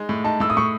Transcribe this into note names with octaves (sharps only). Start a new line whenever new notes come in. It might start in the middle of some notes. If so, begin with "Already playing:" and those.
Already playing: G#3 D#4
A2
D#4 A5
A2 E6
D#6
A2 C#6